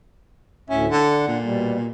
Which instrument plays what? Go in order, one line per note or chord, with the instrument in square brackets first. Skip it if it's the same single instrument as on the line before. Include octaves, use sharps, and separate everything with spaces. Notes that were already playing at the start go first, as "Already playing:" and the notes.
[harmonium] D2 A2 E5 [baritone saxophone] C#4
[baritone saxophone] D3 [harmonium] D4 F#5
[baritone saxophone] A#2
[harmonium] B2 G3